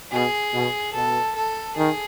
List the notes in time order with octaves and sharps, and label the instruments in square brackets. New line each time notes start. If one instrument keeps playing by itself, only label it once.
[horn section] B2 [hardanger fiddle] G#4
[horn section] B2
[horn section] B2 [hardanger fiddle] A4
[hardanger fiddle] A4
[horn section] D#3 [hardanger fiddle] G#4